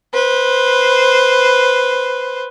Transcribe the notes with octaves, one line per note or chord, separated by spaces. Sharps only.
B4 C5